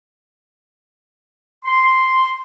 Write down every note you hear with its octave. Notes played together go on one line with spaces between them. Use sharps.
C6